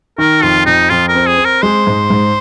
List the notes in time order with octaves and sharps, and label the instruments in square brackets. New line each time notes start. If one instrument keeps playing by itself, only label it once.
[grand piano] D#3 [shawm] A#4
[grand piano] F2 [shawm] F4
[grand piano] F2 [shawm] D#4
[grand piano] F2 [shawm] F4
[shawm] A#4
[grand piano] C4
[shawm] G#4
[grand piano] C4
[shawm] A#4
[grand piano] G#3 [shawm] C5
[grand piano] G#2
G#2